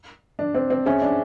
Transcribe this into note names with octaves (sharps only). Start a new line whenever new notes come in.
D4
C4
C4
C#4 G#4 C5 E5 G#5
D4